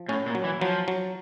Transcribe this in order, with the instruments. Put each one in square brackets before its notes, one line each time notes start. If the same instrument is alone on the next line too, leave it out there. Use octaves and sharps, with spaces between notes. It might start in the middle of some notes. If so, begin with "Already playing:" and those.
Already playing: [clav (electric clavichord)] F3
[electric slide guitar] A2 [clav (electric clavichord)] C#4
[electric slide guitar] A#2
[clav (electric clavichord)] F#3
[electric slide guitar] E3
[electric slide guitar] F3 [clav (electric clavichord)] F#3
[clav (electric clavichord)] F#3